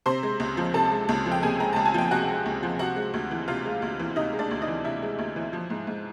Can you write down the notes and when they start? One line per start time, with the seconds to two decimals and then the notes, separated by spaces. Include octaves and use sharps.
0.06 C3 C5 C6
0.23 G#3
0.40 C#2
0.57 F3
0.74 C3 A4 A5
0.91 G#3
1.09 C#2
1.26 F3
1.32 G5
1.42 C3 G#4 G#5
1.60 G#3 A#5
1.73 C#2 A5
1.86 G#5
1.94 F3 G5
2.11 C3 F#4 F#5
2.28 G#3
2.46 C#2
2.63 F3
2.79 C3 F#4 F#5
2.96 G#3
3.14 D2
3.31 E3
3.48 C3 F4 F5
3.65 G#3
3.82 D2
3.99 E3
4.16 C3 D#4 D#5
4.33 G#3
4.39 D4 D5
4.51 D2
4.62 D#4 D#5
4.68 E3
4.85 C3 E4 E5
5.02 G#3
5.19 D2
5.36 E3
5.53 F3
5.70 G#2
5.87 G#2